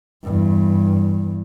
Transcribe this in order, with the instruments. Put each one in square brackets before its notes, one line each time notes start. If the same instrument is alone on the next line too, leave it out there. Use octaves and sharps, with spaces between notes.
[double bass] E2 G2